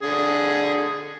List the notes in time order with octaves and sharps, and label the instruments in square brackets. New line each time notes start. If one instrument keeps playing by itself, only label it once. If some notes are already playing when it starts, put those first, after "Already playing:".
[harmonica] D3 G#4